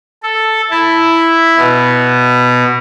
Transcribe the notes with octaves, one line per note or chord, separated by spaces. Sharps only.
A4
E4
B2